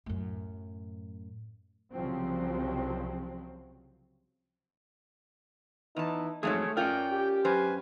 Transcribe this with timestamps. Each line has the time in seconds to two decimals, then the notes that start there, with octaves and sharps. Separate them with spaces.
0.06 F#2 A2
1.92 C2 C#3 F3 F#3 C4
5.97 E2 D#4 E4 B4 A5
6.43 F2 G#2 F#3 A3 G#4 C#5
6.77 C#4 F4 A#4 D5 G5
7.11 G4
7.45 F#2 B4 C5 G#5